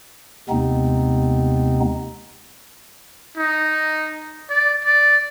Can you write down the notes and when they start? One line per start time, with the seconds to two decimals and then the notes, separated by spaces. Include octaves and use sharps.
0.50 D#2 C3 G#3 B3 C4 D#4
3.37 D#4
4.50 D5
4.85 D5